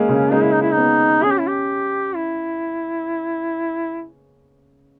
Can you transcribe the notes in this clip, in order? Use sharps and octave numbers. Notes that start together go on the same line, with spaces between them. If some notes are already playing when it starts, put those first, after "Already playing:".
Already playing: G#3 A#3 C#4
C#3
G#3 D#4
E4
D#4
E4
D#4
B3
C#4 G#4
G4
E4
G4
E4